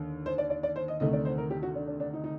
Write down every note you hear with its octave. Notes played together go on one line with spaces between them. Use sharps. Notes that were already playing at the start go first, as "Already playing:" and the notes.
Already playing: D#2 D3
C5
D5
D5
D5
C5
D#5
D2 C3 D#3 A3 D#5
D5
C5
A#4
G4
F#4
D4
D4
D4
D#4
D#4